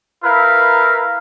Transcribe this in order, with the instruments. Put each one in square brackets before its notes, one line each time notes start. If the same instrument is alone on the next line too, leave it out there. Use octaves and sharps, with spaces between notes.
[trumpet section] E4 A#4 B4 F5